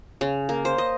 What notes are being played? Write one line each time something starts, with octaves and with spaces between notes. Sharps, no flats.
C#3
A#3
C5
D#5